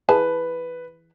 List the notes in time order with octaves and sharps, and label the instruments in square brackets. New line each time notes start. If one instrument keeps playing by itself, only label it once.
[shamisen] E3 G#4 A5 [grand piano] B4